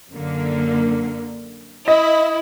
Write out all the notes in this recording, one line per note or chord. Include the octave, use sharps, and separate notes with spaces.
F#2 D3 A#3
E4 D#5